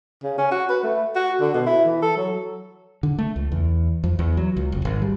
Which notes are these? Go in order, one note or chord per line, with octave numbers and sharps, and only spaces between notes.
C#3
C#4
F#4
B4
A3
F#4
D3
B2
E4
E3
A4
F#3
D3
A3
C#2
E2
F2
E2
F#3
C#2
F1
G#1
G3